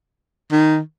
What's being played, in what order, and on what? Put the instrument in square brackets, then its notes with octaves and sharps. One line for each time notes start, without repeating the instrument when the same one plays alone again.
[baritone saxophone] D#3